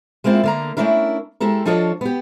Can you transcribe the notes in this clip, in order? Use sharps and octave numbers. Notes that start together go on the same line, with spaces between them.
G#3 A#3 C4 E4 F4
D3 A#3 A#5
A3 A#3 C#4 D4 E4 A#4
G#3 E4 G4 A4 A#4
F3 D4 F4 A4 C#5 D#5
B3 G4